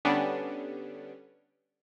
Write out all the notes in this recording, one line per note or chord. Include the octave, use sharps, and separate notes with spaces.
D3 G3 B3 C#4 D4